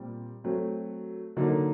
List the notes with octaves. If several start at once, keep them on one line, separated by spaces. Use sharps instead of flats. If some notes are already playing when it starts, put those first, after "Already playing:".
Already playing: A#2 G3 C4
F#3 A3 C4
D3 F#3 A#3 D#4